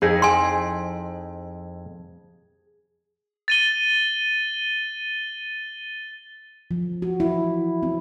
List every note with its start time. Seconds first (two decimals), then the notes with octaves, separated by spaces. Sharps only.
0.02 F2 D#4 E4 G#4
0.22 G#5 C6
3.48 A6 D#7 G7
6.71 F3
7.02 F#4
7.20 E4
7.83 C4